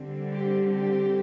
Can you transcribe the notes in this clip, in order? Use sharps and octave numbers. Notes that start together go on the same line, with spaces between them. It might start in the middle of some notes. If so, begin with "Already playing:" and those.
Already playing: D3 G3 C4
G4
G4